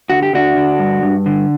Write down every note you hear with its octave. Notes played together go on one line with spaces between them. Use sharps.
D3 F#4
G4
D3 D4 F#4
D3
G2
G2
D3